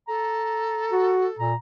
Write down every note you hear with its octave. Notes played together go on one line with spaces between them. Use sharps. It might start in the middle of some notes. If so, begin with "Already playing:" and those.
A4 A#5
F#4
A#2 A#5